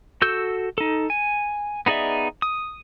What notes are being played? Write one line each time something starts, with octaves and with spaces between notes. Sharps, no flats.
F#4 A4 E6 G6
D#4 A4
G#5
B3 D#4 G#4 D5 E5
D#6